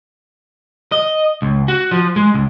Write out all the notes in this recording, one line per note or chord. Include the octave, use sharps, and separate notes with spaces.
D#5
C#2
F#4
F3
G#3
C#2